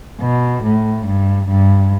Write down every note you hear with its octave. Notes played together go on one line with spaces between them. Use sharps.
B2
A2
G2
G2